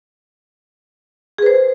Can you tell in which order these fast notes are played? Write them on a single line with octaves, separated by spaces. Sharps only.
G#4 B4 C5